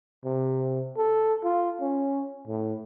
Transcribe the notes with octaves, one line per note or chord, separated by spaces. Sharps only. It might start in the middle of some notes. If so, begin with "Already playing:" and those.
C3
A4
F4
C#4
A2